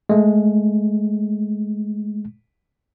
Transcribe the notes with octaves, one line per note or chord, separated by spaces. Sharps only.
G#3 A3